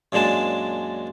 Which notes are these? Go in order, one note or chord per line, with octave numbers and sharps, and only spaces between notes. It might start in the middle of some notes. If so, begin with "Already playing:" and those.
F#2 A#2 G#3 D4 A5